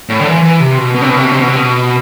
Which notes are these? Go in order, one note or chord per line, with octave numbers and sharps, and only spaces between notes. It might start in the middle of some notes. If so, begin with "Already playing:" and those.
A2
D3
E3
E3
C3
B2
B2
C3
B2
C3
B2
C3
B2
C3
B2